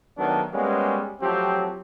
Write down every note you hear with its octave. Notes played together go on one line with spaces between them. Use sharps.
D#3 F#3 A3 B3 D4
G3 G#3 A#3 B3 C#4
F3 F#3 A3 C4 G4